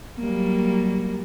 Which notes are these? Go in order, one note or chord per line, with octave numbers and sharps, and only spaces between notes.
F#3 G3 A#3